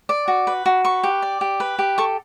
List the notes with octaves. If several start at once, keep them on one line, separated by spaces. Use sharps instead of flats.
D5
F#4
B4
F#4
B4 C#6
G4
D5
G4
B4
G4
A4 C#6